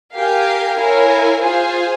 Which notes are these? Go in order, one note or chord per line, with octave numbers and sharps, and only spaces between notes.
G4 A#4 F5 G#5
E4 A#4 C#5 F5 G#5
F4 G#4 C5 F5 G#5